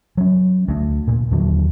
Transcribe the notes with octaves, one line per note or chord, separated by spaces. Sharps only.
F#3 C#4
D2
A#2
D#2 D3 F#3